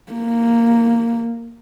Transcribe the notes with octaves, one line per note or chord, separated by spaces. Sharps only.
A#3